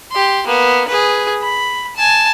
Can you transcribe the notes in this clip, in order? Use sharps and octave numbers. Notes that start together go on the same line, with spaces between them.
G4 C6
A#3 B3
G#4 B4
B5
G#5 A5